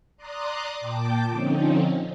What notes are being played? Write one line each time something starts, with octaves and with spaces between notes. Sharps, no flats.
D5 A#5 C6 D6 D#6 F#6
A#2 G5 A5 D6
D3 F3 C4 C#4 D#4